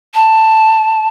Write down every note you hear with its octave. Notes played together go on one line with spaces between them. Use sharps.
A5